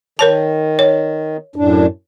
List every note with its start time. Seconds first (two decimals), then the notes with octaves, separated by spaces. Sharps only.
0.19 D#3 A#4 C#5 A5
0.79 C#5
1.56 F#2 A2 D4